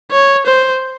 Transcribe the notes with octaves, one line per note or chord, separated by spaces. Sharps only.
C#5
C5